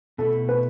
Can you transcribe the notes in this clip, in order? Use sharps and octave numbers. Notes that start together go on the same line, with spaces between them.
B2 A3 E4 A4
B4